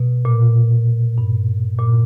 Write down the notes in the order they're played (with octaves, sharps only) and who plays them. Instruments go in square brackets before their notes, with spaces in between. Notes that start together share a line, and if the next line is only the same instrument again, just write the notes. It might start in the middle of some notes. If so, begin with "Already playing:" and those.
Already playing: [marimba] B2
A#2
G2
A#2